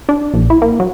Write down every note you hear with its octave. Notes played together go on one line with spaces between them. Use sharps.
D4
A#1
E4
A#3
F#3